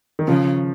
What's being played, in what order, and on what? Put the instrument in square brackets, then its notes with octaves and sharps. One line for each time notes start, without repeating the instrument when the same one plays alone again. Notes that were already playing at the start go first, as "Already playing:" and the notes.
[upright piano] D#3
[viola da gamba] C#3 [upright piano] F3